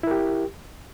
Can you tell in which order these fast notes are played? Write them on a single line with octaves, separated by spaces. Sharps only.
E4 A#4 G4